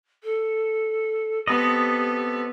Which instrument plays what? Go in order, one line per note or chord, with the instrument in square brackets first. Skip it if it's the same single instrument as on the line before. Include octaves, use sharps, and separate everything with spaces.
[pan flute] A4
[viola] B3 [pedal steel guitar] C4 A4 D#5 [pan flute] G4